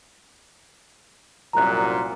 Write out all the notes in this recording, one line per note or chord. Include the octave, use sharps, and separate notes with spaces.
C2 F#2 A#2 A#5 F#6